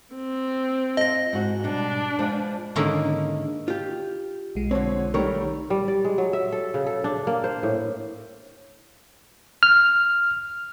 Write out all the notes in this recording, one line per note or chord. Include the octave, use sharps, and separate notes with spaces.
C4
F4 A4 D#5 A#6
G#2 F#4
B2 G3 D4
F3 G#3 B3
G#2 D3 D#3 A#3 C#4 E4
F4 G4
B1 G#3
D3 F3 C4 C#5
D#3 G3 A3 A#4 C#5
G3
D5
G#3
F#3
E5
A4
C#3
A4
D4
A#3
C5
A2
F6